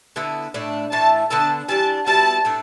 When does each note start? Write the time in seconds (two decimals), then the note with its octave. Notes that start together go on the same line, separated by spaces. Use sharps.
0.16 D3 B3 E4 A4
0.54 A2 A3 D4
0.92 A2 E3 A3 A5
1.30 D3 B3 D4 A4 A5
1.69 E3 G3 D4 A5
2.07 B2 G3 B3 E4 A5
2.45 A2 A3 D4 A4